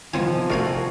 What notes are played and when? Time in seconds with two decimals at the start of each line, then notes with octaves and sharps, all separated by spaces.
0.14 C3 D#3 F3 B3 C4 G#5
0.50 A3 F#4 A#4 D5 F5 G#5